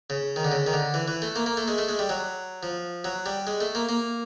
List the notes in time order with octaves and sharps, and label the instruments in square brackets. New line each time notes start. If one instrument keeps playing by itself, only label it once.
[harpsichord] C#3
D#3
D3
C#3
D#3
D3
E3
E3
A3
A#3
A#3
A3
G#3
A3
G#3
G3
F#3
F3
F#3
G3
G#3
A3
A#3
A#3